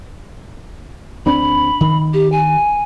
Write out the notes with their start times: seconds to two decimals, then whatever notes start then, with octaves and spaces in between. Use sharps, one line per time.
1.26 D2 C4 D4 B5
1.81 D#3
2.14 G4
2.32 G#5